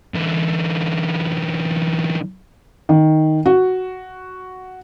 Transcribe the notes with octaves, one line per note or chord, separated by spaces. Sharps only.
D3 E3
D#3
F#4